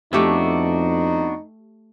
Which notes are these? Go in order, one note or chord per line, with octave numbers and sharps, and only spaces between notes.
F2 A3 B3 D4 D#4 F#4 G4 E5